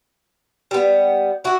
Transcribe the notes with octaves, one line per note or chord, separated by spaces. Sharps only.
G3 B3
E4 F#4